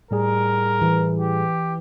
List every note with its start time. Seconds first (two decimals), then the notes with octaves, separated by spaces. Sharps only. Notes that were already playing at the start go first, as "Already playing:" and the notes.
0.11 A2 G3 G#4 A#4
0.82 E3
1.20 G4